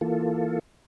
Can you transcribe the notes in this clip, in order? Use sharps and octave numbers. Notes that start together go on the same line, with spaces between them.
E3 A#3 F4 A4